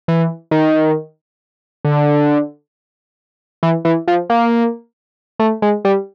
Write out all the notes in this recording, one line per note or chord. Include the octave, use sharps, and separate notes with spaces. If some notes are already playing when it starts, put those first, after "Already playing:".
E3
D#3
D3
E3
E3
F3
A#3
A3
G#3
G3